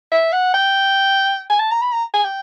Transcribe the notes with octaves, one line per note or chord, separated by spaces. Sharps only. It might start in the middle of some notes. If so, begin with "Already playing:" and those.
E5
F#5
G5
G#5
A5
A#5
B5
A#5
G#5
G5